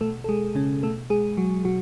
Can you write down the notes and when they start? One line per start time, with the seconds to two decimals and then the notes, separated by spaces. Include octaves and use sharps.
0.01 B2 A3 A4
0.24 A4
0.29 G#3 G#4
0.55 C#3 C#4
0.83 B2 A3 A4
1.10 G#3 G#4
1.37 F#3 F#4
1.65 B2 F#3 F#4